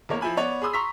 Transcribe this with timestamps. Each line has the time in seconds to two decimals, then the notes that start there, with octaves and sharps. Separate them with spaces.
0.09 E2 A#3 C#5
0.21 F3 E4 G#5 B5
0.37 B3 C#5 D5
0.62 G#4 B5 C6 D#6 E6
0.73 A#5 C6 C#6 E6 B6